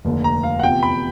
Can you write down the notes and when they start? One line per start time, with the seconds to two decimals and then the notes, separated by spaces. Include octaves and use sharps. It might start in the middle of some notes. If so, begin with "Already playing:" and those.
0.05 F1 D#2 D3
0.24 A#5
0.43 F5
0.59 F#5
0.63 E2 C3 F3 G5
0.83 B5